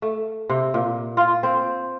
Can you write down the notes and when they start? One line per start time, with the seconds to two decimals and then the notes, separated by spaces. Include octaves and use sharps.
0.02 A3
0.50 C3
0.74 A#2
1.17 F4
1.43 C4